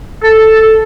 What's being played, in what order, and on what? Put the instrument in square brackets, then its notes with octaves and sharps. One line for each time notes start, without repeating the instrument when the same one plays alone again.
[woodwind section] A4